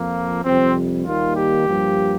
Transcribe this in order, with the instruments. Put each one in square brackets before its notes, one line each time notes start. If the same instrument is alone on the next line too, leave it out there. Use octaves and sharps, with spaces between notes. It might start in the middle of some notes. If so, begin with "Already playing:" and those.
Already playing: [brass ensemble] F2 F3 A#3
F2 C3 G3 C4
D#2 D#3 G3 A#3 F4
G4
G2 F3 A#3